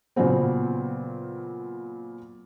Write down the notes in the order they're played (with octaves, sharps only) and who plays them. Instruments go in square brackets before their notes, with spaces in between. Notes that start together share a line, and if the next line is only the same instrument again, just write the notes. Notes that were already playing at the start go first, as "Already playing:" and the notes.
[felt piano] A#2 C#3 F#3 B3 C4